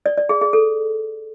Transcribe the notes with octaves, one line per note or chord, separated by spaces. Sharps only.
D5
D5
G#4
G#4
A4